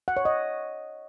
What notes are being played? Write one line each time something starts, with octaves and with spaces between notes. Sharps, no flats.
F#5
C#5
D#5